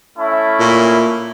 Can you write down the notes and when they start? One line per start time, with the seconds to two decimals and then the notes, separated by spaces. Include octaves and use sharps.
0.18 A3 C#4 E4
0.59 A#2